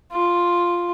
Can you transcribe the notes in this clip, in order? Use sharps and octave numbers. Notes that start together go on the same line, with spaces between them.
F4